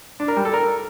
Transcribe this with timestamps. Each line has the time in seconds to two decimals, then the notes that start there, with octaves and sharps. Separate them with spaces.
0.20 D4
0.28 A#4
0.37 G3
0.45 A4
0.53 A#4